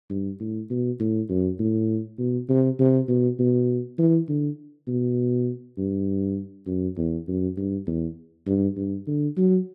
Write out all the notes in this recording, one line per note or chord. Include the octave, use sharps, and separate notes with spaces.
G2
A2
B2
A2
F#2
A2
B2
C3
C3
B2
B2
E3
D3
B2
G2
F#2
E2
F#2
G2
E2
G2
G2
D3
F#3